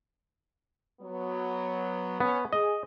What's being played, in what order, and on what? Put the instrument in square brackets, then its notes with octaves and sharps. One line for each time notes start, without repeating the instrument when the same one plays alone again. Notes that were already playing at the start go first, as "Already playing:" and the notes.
[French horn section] F#3 B3
[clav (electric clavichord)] B3 [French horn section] C#4
[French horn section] G#4 [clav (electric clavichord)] D#5